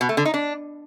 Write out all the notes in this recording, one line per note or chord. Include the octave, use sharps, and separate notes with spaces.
B2
A3
D3
D#4
D4